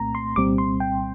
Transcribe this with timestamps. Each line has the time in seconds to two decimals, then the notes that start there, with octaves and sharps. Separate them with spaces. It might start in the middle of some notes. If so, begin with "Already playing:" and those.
Already playing: C2 A#2 A3 C4 A#5
0.15 C6
0.36 C2 A#2 G3 C4 D6
0.58 C6
0.80 G5